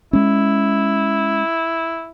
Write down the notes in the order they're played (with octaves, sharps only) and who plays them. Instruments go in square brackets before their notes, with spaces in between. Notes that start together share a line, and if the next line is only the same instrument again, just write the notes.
[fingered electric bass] G#3 C#4 [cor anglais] E4